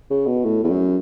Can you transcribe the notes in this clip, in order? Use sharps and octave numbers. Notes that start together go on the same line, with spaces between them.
C#3
B2
A2
E2
F#2